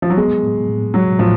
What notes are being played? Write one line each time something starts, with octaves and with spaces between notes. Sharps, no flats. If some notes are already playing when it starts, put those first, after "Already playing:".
F3
F#3
G#3 B3
A2
A2
F#3 G#3
A2 F3